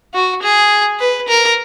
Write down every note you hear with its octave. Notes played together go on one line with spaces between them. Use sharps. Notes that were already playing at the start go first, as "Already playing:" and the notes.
F#4
G#4
B4
A#4